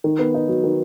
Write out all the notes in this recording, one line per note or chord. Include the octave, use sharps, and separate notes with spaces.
D#3
B3
D#4
F#3
D#3